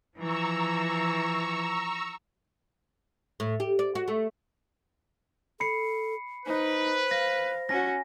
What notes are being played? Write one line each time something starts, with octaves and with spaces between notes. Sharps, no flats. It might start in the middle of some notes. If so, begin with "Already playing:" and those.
E3 F3 A#5 C#6 E6
A2
G4
D5
F#4
A3
A4 B5 C7 C#7
D#4 B4 C5
F5 A#6
C#4 F#4 G#5 A#6